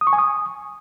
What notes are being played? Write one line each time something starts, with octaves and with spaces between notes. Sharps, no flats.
D#6
C#6
G#5
D#6